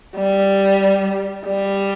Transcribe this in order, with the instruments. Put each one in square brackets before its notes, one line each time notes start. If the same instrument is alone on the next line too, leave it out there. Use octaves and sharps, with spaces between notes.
[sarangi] G3
G3